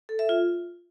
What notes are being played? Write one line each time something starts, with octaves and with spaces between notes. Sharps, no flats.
A4
E5
F4